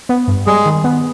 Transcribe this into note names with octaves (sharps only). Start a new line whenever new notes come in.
B3
G2
G3 G#3 G#4
D#3
B3